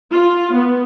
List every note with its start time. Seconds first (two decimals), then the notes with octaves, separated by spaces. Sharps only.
0.11 F4
0.55 B3